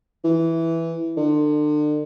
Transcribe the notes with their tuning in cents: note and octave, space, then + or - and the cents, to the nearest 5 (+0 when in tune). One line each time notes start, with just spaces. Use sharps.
E3 +0
D3 +35